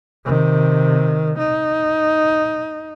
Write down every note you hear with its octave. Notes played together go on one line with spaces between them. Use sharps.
C3 D#3
D#4